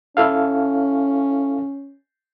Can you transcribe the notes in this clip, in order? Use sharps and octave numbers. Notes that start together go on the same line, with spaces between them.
C#4 E4 A4 F5